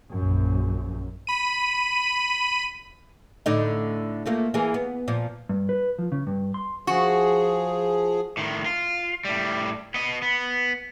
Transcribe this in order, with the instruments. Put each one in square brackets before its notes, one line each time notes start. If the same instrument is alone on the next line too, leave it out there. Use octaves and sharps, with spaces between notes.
[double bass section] A#1 F#2
[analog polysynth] B5 D#7
[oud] A2 D3 D#4
F3 A3 A#3
E3 A#3 G#4
B3
A#2 F3
[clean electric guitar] G2
B4
F3
C#3
G2
C6
[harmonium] F3 G#4 [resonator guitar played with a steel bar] F#4
[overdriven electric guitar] A2 D#3
F4
A2 G3
B3 D#5
B3